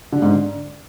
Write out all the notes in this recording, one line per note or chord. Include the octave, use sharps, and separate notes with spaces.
D3
G#2
D3